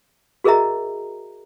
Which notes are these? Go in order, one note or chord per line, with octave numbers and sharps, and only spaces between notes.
F#4 G#4 A#4 D#5 E5 A#5